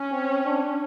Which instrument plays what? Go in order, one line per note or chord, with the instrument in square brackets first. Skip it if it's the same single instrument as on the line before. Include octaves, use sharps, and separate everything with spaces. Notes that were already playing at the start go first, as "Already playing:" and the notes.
Already playing: [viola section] C#4
[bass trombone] C4
D4